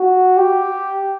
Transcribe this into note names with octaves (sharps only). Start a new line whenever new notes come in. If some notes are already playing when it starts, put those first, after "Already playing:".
Already playing: F#4
G4